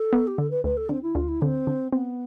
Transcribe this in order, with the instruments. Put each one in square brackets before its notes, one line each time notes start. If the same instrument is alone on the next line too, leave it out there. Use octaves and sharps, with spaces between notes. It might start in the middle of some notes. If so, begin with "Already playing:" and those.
Already playing: [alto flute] A4
[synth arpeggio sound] B3
[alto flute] G4
[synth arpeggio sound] D3 [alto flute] A4
[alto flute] B4
[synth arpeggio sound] D2 [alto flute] B4
[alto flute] A4
[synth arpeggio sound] D3 [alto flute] C4
[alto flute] E4
[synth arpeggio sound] D2 [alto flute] F4
[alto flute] E4
[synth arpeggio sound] D3 [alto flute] C4
[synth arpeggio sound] D3
[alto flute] B3 [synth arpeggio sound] C4